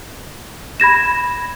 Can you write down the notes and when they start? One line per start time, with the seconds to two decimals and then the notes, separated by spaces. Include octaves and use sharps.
0.80 B5 G#6 A#6 E7